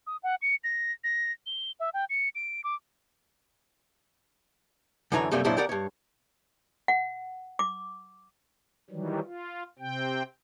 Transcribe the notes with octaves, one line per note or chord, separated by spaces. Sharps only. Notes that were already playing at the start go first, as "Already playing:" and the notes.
D#6
F#5
C#7
A#6
A#6
G7
E5
G5
C#7
D7
D6
F#2 D3 E3 C#5 A#5
F#2 C3 G3 A3 A#3
F2 A#2 F#3 D4 E4 C5
F2 G4 A#4 D5 F#5
G2 C#5
F#5
D6
D#3 E3 F#3 G3
F4
C3 C4 G5